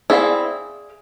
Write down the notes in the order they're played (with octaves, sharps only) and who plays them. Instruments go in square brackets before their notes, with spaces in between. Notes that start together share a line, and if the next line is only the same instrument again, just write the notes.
[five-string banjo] C4 E4 [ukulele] G#4 D5 F5